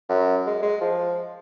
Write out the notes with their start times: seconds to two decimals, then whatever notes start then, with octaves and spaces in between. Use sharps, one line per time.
0.09 F#2
0.46 G#3
0.62 G#3
0.81 F3